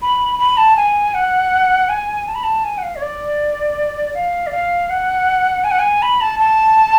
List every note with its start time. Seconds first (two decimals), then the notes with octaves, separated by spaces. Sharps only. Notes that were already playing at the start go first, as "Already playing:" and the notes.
0.02 B5
0.39 B5
0.57 A5
0.76 G#5
1.14 F#5
1.89 G#5
2.27 A5
2.35 B5
2.43 A5
2.64 G#5
2.78 F#5
2.83 F5
2.96 C#5
3.02 D5
4.15 F5
4.47 D5
4.52 F5
4.90 F#5
5.64 G#5
5.71 F#5
5.79 G#5
6.02 B5
6.21 A5
6.39 A5